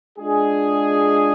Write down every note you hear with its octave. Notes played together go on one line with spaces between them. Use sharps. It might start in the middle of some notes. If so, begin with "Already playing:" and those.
G#3 D4 F4 G#4